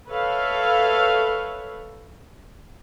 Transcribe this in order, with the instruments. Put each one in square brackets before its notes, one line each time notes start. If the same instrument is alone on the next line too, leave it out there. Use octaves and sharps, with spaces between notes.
[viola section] A4 B4 C#5 E5 F5